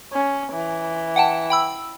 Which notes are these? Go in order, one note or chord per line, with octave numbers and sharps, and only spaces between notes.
C#4
E3
F#5 G5 A5
G5 B5 E6